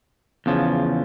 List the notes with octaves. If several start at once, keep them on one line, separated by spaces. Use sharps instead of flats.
E2 C#3 F3